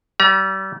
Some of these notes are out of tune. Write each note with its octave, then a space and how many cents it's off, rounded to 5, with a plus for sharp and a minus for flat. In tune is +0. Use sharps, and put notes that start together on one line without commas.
G3 -35 A#5 +40